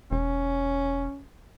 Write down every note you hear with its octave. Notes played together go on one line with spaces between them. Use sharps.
E1 C#4